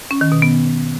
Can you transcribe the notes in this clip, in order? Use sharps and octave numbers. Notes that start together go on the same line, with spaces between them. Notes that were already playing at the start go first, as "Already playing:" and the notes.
C#4
D#3
B2
B3